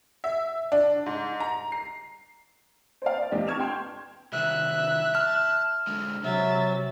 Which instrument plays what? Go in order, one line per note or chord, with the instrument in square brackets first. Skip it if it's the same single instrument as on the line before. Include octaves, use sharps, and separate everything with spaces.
[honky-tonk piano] E5
D4
G#2
A#5
C7
C5 D5 F5
D5
E2 C4 D4 G4 D#5
A5 C#6 F6 G#6 E7 F7
G5 C6 F6 G6
[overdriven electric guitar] C2 D#3 [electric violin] E5 F#6
[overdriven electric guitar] A5 [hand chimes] F6
[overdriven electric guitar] D3 G#3
[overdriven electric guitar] C3 [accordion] F#3 [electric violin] E5 A6